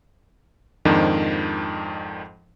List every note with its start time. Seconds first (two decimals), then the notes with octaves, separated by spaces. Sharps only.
0.85 F2 G#2 D#3 F3 D4 D#4